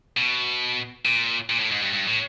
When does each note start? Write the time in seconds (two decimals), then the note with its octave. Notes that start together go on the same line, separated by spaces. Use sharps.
0.17 B2
1.05 A#2
1.50 A#2
1.59 A2
1.72 G#2
1.82 G2
1.93 G2
2.08 A2